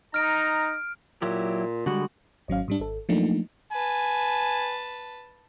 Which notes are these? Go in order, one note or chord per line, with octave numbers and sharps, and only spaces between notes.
D#4 A#5 F6 D7
A#2 F#3 E4 G4
D3 G3 G#3 F#4
G#1 F#3 C#4 F5
G#2 G3 D4
G#1 A4
F3 F#3 A3 A#3 D4 D#4
B4 G#5 A5